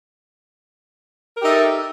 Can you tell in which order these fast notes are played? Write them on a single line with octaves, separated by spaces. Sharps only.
A#4 G4 D#4 E5 A4